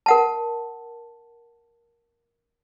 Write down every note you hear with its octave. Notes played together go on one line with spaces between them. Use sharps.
A#4 F#5 A5